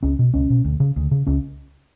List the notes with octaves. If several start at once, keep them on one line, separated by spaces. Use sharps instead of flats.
C#2 C#4
B2
C#2 C#4
B2
D2
C#3
D2
C#3
C#2 C#4